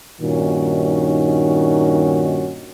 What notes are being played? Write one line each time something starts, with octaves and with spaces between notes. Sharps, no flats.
G2 A#2 D#3 C#4 D#4 F#4